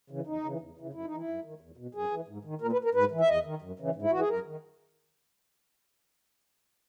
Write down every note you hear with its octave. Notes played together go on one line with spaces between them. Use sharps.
C#3 E3
E2 D#4
C#3 E3
E2
C#3 E3
F#2 E4
D#4
E3
E4
F#2
D#3
E2
B2
F#2 G#4
E3
G#2
D#3
A#2 A#4
B4
A#4
G#2 B4
E3
E5
E2 D#5
D#3
F#2
C#3 E3
G#2
E4
E3 F#4
G#4
F#2 A#4
D#3